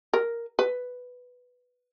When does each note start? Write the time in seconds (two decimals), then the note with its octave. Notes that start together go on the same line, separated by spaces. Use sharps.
0.13 A#4
0.59 B4